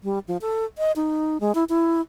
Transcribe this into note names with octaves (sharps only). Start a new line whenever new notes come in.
G3
F3
A4
D#5
D#4
G#3
E4
E4